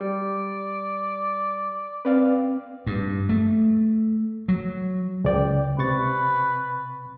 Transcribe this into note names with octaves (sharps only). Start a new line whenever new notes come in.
G3 D5
C4 B4 D5 F5
G2
A3
F#3
C#2 D5 G5
C3 B4 C#6 A6